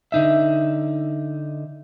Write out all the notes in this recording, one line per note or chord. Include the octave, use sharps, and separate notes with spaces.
D3 D#4 E5